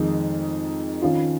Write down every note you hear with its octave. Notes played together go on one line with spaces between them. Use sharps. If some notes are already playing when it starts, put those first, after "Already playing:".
Already playing: F2 D#3 G#3 D#4
D#3 C#4 F4